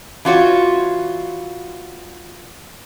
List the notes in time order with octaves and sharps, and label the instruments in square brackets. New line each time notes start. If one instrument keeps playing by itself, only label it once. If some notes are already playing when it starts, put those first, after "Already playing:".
[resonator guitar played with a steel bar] E3 F4 F#4 C#5